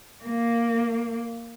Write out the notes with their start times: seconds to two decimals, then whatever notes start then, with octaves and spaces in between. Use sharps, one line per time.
0.23 A#3